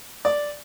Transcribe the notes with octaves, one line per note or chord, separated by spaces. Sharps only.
D5